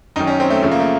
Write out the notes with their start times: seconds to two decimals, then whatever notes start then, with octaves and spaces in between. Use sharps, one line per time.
0.16 F#2 D#3 F#3 D#4
0.27 C#4
0.40 C4
0.50 A3
0.62 F#2 C#3 F3 A3
0.72 A#3
0.80 A3